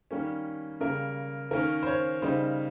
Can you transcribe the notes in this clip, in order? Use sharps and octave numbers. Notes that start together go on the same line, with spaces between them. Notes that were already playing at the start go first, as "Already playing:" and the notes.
D#3 G3 A#3 C#4
C#3 G3 A#3 A#4
D#3 A#3 C#4 A#4
C5
C#5
C#3 G3 A#3 D#4 C5